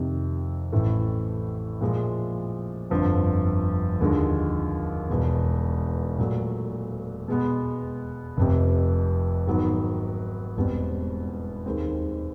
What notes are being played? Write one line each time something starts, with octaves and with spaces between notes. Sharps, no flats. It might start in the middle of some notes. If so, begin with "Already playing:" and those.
Already playing: F2 C3 D#3
A1 A2 E3 A3
A#2 F3 G#3
G1 F2 D3 F3
D#2 D3 F3 G#3
E1 E2 B2
A#2 F#3 A3
B2 G#3 B3
F1 F2 C3
G#2 D#3 F#3 B3
E1 E2 B2 G3 C4
D#2 D#3 G#3 C4